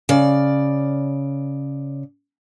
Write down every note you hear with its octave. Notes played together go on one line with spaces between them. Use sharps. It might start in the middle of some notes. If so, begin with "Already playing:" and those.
C#3 D5